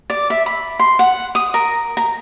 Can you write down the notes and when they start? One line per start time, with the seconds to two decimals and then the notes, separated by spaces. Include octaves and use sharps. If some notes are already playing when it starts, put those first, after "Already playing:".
0.10 D5
0.30 E5
0.46 B5
0.79 C6
0.99 F#5
1.35 D#6
1.54 A#4
1.97 A#5